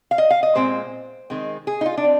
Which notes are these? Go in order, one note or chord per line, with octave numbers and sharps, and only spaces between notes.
F5
D#5
F5
D#5
A#2 G#3 C4 C5
D#3 G#3 C4
G#4
D#4
F4
D4
C4